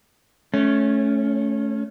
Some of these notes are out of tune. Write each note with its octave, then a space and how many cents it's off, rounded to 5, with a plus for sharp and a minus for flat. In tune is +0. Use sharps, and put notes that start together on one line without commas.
A3 -15 C#4 +0